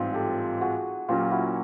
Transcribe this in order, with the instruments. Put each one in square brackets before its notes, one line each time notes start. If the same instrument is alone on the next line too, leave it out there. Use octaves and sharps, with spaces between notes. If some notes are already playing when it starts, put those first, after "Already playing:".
Already playing: [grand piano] A1 G#2 E3 G3 C4 [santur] D#4 F4
[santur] G4 A4
F#4 G#4
[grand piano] A#2 F#3 A#3 C#4 [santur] F4 G4
[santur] E4 F#4